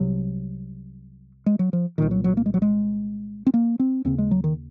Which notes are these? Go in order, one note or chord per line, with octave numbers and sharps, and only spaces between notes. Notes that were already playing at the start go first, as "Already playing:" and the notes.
Already playing: C2 C3 F#3
G#3
F#3
F3
C2 A#2 D#3
F#3
F#3
A#3
G#3
F#3
G#3
C4
A#3
C4
D#2 C#3 C4
G#3
F#3
D#3